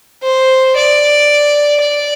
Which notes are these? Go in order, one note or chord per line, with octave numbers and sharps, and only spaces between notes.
C5
D5
D5